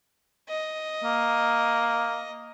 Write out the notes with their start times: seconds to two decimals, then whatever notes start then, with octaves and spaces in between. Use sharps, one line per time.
0.50 D#5
1.04 A#3